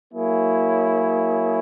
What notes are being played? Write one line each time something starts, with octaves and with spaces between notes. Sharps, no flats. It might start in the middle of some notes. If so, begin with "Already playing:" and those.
F#3 A#3 E4 G#4 C#5